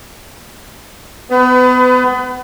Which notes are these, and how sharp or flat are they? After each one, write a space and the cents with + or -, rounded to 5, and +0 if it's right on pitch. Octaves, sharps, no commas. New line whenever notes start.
B3 +30 B4 +40